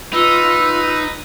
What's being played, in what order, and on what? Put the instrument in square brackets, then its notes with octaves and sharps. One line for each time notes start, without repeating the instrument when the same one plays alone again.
[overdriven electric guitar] D#4 [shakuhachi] F4 [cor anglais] B4 [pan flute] E6